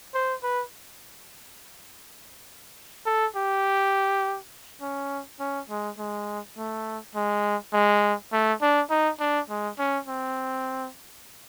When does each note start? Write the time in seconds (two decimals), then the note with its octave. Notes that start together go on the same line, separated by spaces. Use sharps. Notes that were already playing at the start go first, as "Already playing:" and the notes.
0.14 C5
0.43 B4
3.06 A4
3.36 G4
4.81 C#4
5.40 C#4
5.69 G#3
5.99 G#3
6.57 A3
7.15 G#3
7.73 G#3
8.33 A3
8.62 D4
8.90 D#4
9.20 D4
9.50 G#3
9.79 C#4
10.07 C4